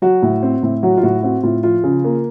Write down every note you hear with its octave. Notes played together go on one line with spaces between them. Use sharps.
F#3 F#4
A2
C4
A2
F#3 F#4
F4
A2 F#4
C4 F#4
A2 F4
F3 F4
C#3
A#3